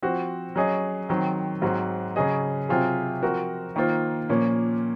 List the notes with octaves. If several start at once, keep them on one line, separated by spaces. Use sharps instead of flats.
F3 C4 F#4
F#3 C#4 G#4 D#5
D#3 F#3 C4
G#2 F#3 C4 F#4
C#3 F#3 C#4 G#4 D#5
C3 F#3 C4 F4 G#4
F3 C4 F#4 A#4
D#3 A#3 F4 C5
A#2 F3 A#3 C#4